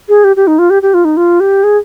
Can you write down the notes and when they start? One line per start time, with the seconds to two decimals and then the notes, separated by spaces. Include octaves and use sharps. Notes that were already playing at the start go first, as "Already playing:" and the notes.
0.09 G#4
0.24 G4
0.36 G4
0.47 D#4
0.59 F4
0.70 G4
0.82 G4
0.94 F4
1.05 D#4
1.17 F4
1.40 G4
1.64 G#4